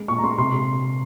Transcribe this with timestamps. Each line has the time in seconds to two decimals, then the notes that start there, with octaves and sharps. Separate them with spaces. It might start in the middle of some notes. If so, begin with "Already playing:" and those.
Already playing: G#3
0.08 A#2 C#6
0.18 A#5
0.23 G#3 C6
0.38 C3 C6